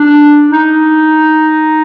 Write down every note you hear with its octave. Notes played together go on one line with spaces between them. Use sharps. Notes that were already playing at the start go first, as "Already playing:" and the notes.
Already playing: D4
D#4